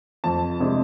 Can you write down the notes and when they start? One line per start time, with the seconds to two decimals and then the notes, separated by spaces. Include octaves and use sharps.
0.24 F2 A5
0.60 C3 G#3 D4